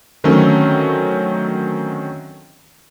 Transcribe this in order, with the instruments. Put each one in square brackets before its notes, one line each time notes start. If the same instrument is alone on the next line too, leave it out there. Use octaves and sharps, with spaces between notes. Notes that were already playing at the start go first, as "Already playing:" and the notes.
[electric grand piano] D3 D#3 F#3 A3 C4 C#4